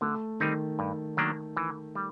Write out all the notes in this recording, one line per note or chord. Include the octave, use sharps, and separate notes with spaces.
D3 A3
D#3 G3 C4 D#4
G2
D#3 F#3 A#3 D4
E3
G3